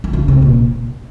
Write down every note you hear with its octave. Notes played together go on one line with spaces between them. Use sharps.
D#3
D3
C3
A#2